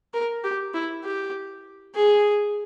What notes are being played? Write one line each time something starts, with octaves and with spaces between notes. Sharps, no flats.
A#4
G4
E4
G4
G#4